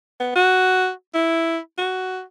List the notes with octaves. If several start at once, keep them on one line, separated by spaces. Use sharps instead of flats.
B3
F#4
E4
F#4